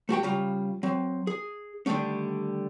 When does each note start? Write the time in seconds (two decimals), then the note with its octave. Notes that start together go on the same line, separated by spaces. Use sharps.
0.09 A3 F#4 G4 G5
0.23 C#3 G3 F4 A#5
0.83 F#3 C4
1.27 G#4
1.86 D3 D#3 G3 A3 C#4